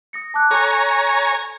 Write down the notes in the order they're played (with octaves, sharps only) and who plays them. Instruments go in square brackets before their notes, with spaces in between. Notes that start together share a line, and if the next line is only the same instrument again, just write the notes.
[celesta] D#6 A#6 C#7
A5 D6 F#6
[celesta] A4 F#6 [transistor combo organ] C#5 G#5 A#5